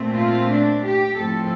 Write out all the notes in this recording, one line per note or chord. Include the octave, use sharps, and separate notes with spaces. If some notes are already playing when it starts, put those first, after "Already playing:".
Already playing: A#2 A3 C4
F4
D4
G4
A2 F3 C4 A4